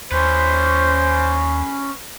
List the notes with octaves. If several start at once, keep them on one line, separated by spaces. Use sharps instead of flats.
D#2 C#4 B4 C5